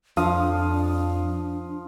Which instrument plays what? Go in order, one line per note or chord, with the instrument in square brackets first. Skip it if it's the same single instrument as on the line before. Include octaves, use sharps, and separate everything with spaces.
[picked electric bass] F2 [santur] F3 F5 D#6 [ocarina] D4